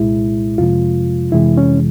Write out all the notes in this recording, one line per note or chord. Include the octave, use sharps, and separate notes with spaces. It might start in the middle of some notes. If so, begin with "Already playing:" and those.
Already playing: C2 A#2 G#3 E4
F2 C3 F3 G#3 F4
F2 C3 E3 G#3 E4
C#4